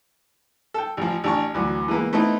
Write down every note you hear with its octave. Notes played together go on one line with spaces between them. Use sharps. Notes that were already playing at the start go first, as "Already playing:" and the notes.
A4 G5
A1 F3
A1 D4 A5 C#6
D2 E3 F#3
E3 G#3 A#3 B3
A3 B3 C4 D#4 E4